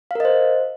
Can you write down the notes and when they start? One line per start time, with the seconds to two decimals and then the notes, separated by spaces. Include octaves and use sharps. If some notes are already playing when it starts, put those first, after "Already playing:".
0.11 F5
0.15 A#4
0.20 D#5
0.25 C5